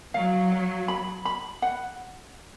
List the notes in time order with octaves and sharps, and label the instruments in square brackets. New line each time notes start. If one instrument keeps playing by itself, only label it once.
[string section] F#3 [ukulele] F5
[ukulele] F5
B5
B5
F#5